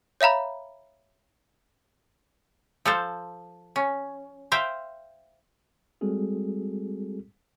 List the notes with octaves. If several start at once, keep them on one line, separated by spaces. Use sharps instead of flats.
C#5 E5 F5 A#5 B5
F3 A4 C5
C#4
C5 E5 F5 G5
G3 G#3 C4 F#4 G#4 A4